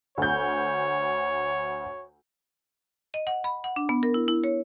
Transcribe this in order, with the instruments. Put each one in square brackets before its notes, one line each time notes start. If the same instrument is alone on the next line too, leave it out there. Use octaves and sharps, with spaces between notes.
[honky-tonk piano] D2 G6 [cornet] C#5
[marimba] D#5
F#5
B5
F#5
D4
B3
A#4
E4
E4
C#5